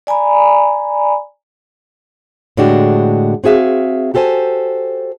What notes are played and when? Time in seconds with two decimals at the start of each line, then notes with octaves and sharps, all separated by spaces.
0.07 D5 G#5 A#5 B5
2.57 A2 D3 G#3 D4 F#4 G4
3.44 C4 F#4 G#4 E5 F5
4.14 F#4 G4 A4 C5 G#5